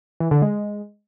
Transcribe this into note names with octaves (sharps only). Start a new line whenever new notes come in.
E3
D3
G#3